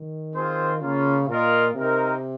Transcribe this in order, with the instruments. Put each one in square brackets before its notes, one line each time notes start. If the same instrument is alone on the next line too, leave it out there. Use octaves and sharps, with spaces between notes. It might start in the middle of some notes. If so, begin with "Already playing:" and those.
Already playing: [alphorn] D#3
[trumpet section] C4 F4 G#4 C5
[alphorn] C#3 [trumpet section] A#3 C#4 F4
[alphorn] A#2 [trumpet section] F4 A#4 D#5
[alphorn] C3 [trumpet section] C4 D#4 A#4